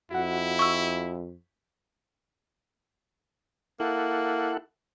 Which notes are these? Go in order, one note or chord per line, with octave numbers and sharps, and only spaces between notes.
F2 E4 F#4 F#5
C#6 E6
A#3 E4 A4 F#5